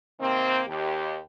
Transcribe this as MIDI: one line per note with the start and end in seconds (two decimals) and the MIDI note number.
0.20 0.60 48
0.20 0.60 51
0.20 0.60 58
0.20 0.60 60
0.67 1.18 39
0.67 1.18 67